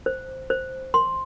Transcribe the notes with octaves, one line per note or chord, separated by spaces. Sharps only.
C5
C5
C6